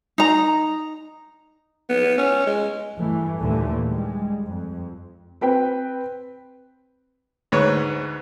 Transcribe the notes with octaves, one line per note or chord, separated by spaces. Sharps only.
D#4 A#5
B3
C#4
G#3
G2 E3 A3
D#2 A#2 D3 E3 A3
G3 G#3
F2
C4 B4 G5
D2 G#2 B4 C#5